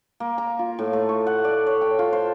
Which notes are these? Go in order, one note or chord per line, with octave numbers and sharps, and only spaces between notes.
A#3
A#5
F4
A2
A3
C#6
F#5
D5
C#5
G5
F4
C5